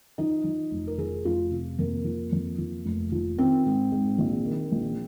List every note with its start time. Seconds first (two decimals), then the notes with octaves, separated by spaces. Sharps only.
0.18 F3 D#4
0.44 F3
0.71 F1
0.87 A#4
0.98 F3 G#4
1.25 F1 F4
1.51 C3
1.78 F2 A#3
2.05 F3
2.32 F2
2.58 F3
2.85 F1
3.12 F3
3.38 D#3 C4
3.66 G#2
3.92 G#2
4.18 A#1
4.45 D#3
4.72 A#1